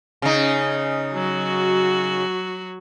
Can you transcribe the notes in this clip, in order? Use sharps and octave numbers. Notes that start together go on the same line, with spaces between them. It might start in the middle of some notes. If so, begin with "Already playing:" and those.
C#3 D#4
F#3 F#4